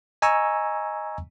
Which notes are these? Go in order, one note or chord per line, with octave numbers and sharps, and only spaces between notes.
D#5 G#5 A#5 C#6 E6